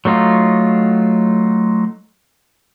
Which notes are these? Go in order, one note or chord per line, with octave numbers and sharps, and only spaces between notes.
F#3 A3 D#4 F4